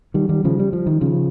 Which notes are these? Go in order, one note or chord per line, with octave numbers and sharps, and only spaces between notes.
D#3 G3
D#3 G3
C#3 F3
G3
F3
D#3
C#3 F3